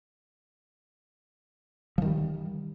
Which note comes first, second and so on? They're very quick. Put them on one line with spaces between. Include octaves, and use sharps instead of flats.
F3 D#3 G3